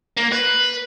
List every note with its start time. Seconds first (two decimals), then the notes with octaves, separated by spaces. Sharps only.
0.17 A#3
0.32 B4